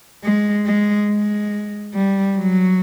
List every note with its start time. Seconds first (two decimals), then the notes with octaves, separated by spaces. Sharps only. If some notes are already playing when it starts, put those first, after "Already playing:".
0.24 G#3
0.66 G#3
1.09 G#3
1.94 G3
2.37 F#3